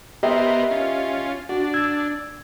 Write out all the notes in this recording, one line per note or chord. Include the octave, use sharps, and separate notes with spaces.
B3 G4 A#4 C5 D#5 E5
C#4 F4
D4 F#4
E6 G#6